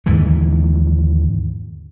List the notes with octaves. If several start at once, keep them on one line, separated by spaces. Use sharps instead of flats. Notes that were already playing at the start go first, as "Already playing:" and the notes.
D#2 G#2 D3 E3